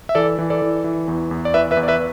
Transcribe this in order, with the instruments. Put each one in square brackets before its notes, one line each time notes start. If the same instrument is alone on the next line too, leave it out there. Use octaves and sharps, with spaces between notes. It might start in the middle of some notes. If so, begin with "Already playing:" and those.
[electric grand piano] E5
E3 A4 D5
E3
A4 D5
E3
E3
E2
E2
D5
E3 B4 E5
B4 E5
E2
D5
B4 E5